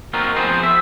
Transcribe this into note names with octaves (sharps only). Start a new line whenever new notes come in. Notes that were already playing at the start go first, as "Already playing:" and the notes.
A#3 C4 D#4 F4 F#4 A#4
F3 B3 C4 G#4 C5
E5